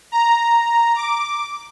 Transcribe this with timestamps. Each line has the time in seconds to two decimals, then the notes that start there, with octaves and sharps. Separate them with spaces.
0.12 A#5
0.96 D6